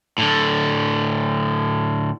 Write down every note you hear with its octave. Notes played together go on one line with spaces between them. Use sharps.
A2 D3